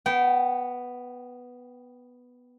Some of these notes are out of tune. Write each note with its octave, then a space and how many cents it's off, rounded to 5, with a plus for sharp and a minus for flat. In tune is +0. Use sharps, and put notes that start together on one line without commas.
B3 +0 G5 -25